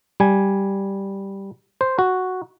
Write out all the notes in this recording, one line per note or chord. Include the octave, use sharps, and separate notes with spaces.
G3 G#5
C5
F#4